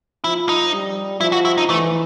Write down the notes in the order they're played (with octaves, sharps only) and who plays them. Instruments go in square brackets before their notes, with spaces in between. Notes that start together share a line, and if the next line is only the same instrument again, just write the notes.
[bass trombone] F3 [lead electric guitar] E4
[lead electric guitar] D#4
[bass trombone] G3
[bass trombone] F3 [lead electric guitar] E4
[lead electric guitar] F#4
E4
D#4
[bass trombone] E3 [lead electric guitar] A3